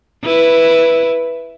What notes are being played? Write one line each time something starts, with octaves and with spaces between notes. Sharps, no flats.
E4 B4